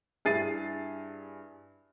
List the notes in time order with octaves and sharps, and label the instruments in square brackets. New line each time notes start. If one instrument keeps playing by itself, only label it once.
[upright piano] G2 E4 G#4 A6 C7 D#7